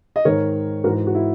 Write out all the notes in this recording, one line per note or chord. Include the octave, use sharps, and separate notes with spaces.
D#5
G#2 D#3 A#4 C#5
G#2 E3 F#4 A#4
F#4
E4